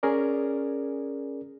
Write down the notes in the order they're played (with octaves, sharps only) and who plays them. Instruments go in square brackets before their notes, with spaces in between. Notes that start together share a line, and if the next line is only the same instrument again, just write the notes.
[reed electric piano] C#4 G#4 A#4 D5